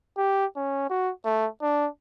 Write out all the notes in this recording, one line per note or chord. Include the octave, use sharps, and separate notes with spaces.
G4
C#4
F#4
A3
D4